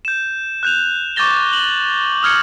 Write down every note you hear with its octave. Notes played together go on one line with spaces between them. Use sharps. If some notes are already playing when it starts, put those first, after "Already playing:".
G6 E7
F#6 G6 F7
C#6 D6 G6 A6 A#6 G7
F#7
D#6 F6 G#6 C#7 F#7